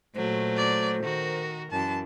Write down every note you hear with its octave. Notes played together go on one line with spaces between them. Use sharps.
A#2 F#3 A3 C5
D5
D#3 F#4 A#4
F#2 E3 A5